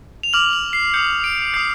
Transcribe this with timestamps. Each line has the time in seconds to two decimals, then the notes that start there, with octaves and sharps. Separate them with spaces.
0.23 F7
0.33 D6 F6 F#7
0.53 F#7
0.73 C7
0.94 D#6 G6 C#7
1.24 D7
1.54 G6 C7
1.57 D#6